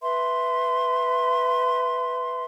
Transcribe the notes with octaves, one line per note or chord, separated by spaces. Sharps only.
B4 E5 C6